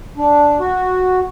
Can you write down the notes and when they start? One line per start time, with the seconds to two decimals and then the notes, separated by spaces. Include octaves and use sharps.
0.17 D4
0.60 F#4